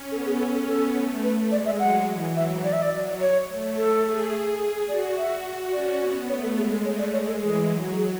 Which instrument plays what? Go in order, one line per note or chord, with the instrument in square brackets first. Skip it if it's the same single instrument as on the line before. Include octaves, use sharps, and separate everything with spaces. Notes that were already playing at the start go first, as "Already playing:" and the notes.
Already playing: [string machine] C#4
[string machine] B3 [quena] A4
[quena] G#4
[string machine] C#4 [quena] A4
[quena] A4
[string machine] B3 [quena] A4
[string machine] A3
[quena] B4
[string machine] G#3 [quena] D5
[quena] E5
[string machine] F#3 [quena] F#5
[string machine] E3
[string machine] F#3 [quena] E5
[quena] D5
E5
D5
[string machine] F#3
[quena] C#5
[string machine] A3
[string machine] A3 [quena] A4
[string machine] G#4
[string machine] F#4 [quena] D5
[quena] E5
[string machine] C#4 [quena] D5
[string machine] B3
[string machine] A3 [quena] C#5
[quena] A4
[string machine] G#3 [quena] G#4
[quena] A4
[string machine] A3 [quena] C#5
[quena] D5
[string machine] G#3 [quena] C#5
[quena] A4
[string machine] E3 [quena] G#4
[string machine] F#3
[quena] G#4